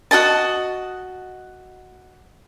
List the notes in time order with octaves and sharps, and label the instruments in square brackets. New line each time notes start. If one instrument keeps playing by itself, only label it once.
[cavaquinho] F#4 G#4 D#5 A5